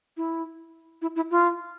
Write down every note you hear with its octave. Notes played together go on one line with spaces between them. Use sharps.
E4
E4
E4
F4